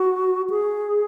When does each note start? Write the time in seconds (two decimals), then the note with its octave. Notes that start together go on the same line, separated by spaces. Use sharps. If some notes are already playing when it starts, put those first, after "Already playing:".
Already playing: F#4
0.50 G#4